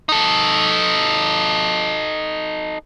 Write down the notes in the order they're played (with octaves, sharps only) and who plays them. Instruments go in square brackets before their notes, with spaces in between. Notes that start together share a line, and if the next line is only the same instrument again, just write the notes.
[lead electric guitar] D#4 A4